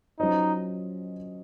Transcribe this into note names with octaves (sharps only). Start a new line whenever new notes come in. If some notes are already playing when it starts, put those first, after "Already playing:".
F#3 C#4 D#4 F4 C5 D#5